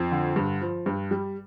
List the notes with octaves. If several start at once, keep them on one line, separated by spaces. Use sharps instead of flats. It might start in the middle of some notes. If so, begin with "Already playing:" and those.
Already playing: F2
D3
G2
F3
G2
G3